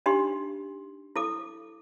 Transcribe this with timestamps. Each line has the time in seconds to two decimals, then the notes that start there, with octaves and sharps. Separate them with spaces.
0.06 D4 D#4 G4 C6
1.16 E4 A4 D6